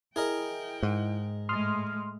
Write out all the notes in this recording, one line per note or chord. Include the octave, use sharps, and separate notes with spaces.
E4 G#4 A#4 D#5 G5
G#2
A2 G#3 C6 D#6 F6